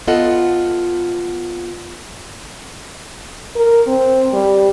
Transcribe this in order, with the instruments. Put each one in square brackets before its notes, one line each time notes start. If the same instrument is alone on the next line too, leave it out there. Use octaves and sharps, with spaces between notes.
[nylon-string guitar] B3 F4 A4 D#5 F#5
[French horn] A#4
C4
G3